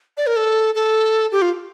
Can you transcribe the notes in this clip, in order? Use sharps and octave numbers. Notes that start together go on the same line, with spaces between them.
D5
A#4
A4
A4
G4
F4